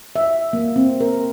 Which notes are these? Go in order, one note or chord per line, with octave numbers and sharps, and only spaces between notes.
E5
A#3
C4
A#4